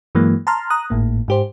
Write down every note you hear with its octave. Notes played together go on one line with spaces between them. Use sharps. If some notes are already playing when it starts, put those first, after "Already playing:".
G2 E3 F#3 G#3 A#3
A5 A#5 C6 F6
A#5 D#6 F#6
G#1 A2 A#3
G#2 G4 C5